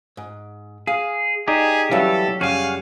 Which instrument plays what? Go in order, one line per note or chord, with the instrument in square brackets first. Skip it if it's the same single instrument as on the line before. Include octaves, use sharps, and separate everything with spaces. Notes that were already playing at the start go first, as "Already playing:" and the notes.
[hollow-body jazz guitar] G#2
[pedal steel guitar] G#4 [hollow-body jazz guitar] F5
[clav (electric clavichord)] D#4 D5 [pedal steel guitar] G4 [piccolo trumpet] G#4
[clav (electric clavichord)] E3 G3 [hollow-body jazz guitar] F#3 C#4 F5 [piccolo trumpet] A4
[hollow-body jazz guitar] F#2 G3 [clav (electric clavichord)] C#3 [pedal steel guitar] F#4 G#5 [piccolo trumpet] F5